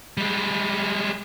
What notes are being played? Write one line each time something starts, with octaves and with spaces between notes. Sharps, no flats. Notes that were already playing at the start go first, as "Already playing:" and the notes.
G3 G#3